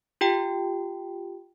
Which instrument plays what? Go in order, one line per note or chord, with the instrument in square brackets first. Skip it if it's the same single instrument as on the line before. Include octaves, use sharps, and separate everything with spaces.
[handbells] F4 G4 G5